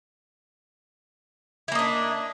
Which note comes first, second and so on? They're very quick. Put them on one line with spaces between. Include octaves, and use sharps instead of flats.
E4 A#3 D#5 D4